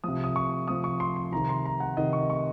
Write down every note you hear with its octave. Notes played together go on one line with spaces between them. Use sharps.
C3 F3 D#6
D#6
C#6
C3 F3 D#6
C#6
C6
C6
C3 D#3 A#5
C6
A#5
F#5
C3 D#3 D#5
C#6
C#6